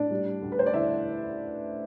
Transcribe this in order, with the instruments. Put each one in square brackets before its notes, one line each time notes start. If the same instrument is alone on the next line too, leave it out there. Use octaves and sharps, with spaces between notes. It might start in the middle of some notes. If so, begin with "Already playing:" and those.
Already playing: [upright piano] A2 D4 D5
G3
D2
B4
C5
D5
D3 E4 E5